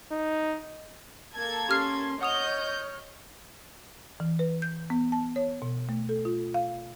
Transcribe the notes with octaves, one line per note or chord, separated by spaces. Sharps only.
D#4
A#3 A4 G#6
C#4 G4 C6 F6 C7
C#5 D#5 F#5 D#6 F6 G6 F7
E3
B4
G6
B3
A5
C#5
B2
A3
A4
F4
F5